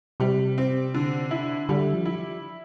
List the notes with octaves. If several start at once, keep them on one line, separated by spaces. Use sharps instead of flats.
C3 G3
C4
D3
E4
D3 G3
F3
E4